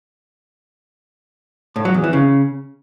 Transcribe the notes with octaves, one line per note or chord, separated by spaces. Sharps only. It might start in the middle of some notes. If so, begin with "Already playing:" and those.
A2
F#3
E2
E3
C#3